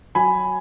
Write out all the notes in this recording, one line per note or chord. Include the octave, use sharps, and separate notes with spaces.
F#3 G#5 B5